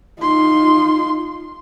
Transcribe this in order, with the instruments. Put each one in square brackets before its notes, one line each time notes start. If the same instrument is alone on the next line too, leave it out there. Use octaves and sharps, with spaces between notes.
[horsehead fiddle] D#4 F4 [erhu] C6